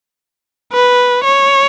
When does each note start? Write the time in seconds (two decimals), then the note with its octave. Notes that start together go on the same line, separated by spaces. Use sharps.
0.73 B4
1.24 C#5